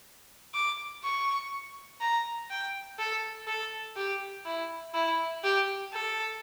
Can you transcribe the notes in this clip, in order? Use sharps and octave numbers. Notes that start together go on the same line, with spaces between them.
D6
C#6
A#5
G5
A4
A4
G4
E4
E4
G4
A4